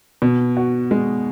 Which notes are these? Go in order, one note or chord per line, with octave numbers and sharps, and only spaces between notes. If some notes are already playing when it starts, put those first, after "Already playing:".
B2
F#4
G#3